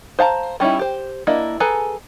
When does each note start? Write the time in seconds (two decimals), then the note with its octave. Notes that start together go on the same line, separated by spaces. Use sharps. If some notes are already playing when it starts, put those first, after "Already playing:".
0.19 C5 F5 A5 A#5
0.60 G3 C#4 D#4 E4
0.79 G4 C5
1.27 A#3 D4 E4 D#5
1.60 G#4 A4 B4 G#5 A#5